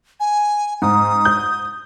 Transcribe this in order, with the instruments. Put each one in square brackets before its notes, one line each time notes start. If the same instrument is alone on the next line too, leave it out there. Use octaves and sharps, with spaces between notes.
[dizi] G#5
[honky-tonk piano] G#2 [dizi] D#6
[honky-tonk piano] G6